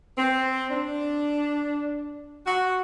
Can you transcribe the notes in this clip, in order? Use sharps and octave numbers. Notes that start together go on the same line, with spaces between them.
C4
D4
F#4